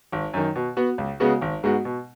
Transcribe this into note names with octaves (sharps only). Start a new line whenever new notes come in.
G#1
F#2 D#3
B2
B3 F#4
C#2
C#3 G#3 B3 F#4
G#1
G#2 G#3 B3 F#4
B2